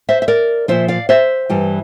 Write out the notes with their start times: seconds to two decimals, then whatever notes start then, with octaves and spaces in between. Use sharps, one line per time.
0.09 C5 E5
0.22 E5
0.28 A#4 D5
0.68 A#2 F3 C5 E5
0.88 D5 F5
1.09 C5 E5
1.50 G2 E3 G3